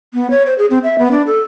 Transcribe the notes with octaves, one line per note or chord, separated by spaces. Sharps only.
B3
C#5
C5
G#4
C4
E5
B3
D4
A4